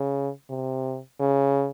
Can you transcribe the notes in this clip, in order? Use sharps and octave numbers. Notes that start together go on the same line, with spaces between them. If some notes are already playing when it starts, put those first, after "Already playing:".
Already playing: C#3
C3
C#3